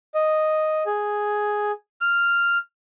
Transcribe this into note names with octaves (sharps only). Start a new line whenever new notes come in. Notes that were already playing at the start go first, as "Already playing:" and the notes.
D#5
G#4
F6